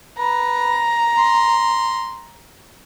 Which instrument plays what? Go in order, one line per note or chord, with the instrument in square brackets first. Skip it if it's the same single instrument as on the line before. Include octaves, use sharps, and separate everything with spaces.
[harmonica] B4 [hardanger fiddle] A#5
[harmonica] C6